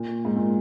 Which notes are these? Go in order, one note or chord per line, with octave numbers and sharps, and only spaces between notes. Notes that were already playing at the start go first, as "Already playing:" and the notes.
Already playing: A#2
G#2
A#2